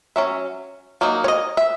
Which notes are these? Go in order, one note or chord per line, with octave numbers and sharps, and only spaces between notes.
F#3 C#4 E5
F#3 A#3 D#4
C#5
D#5
E5